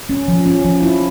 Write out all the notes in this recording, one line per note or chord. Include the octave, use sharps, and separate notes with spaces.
C#4
F3
C#4
F3
E4